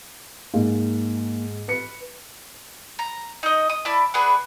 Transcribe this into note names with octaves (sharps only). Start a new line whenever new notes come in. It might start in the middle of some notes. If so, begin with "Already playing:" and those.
G#2 A#3
B4 C#7
A#5
D#4 D#5
D#6
E4 D5 A5 B5
B3 D4 G#4 B4